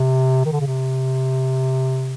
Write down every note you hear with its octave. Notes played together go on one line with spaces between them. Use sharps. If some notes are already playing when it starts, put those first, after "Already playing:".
Already playing: C3
D#3
D3
C#3
C3